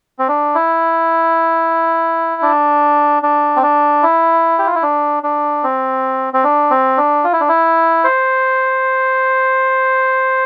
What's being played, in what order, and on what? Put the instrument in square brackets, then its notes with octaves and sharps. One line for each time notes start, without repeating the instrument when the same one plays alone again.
[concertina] C4
D4
E4
D4
D4
C4
D4
E4
G4
F4
E4
D4
D4
C4
C4
D4
C4
D4
F4
E4
D4
E4
C5